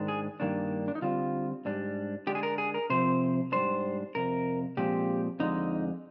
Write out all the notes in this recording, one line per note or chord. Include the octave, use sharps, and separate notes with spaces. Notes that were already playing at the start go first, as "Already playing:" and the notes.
Already playing: G#2 D#3 G#3 D4
G#4
G2 D#3 A#3 D4
D4
D#4
D3 G3 C4 F4
G#2 G3 D4
D3 G#3 D4 G4
G#4
A#4
G#4
A#4
C3 F3 C4 C5
G#2 G3 D4 C5
F2 C3 A#4
A#2 F3 G#3 C4 G4
F2 D3 G#3 D#4